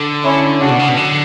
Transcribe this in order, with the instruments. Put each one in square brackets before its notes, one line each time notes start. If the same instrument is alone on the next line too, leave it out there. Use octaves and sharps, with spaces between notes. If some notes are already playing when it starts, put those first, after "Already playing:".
Already playing: [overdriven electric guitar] D3
[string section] C#4 E4
[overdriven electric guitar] C#3 [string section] D4 F#4
[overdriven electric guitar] B2
C#3
B2
D3